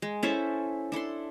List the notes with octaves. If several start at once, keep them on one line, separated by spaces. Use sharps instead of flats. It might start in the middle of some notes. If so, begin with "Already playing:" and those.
G#3
C#4 E4 A4 C5
D4 E4 A4 C6